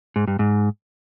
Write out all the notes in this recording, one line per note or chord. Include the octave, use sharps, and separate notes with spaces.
G#2
G2
G#2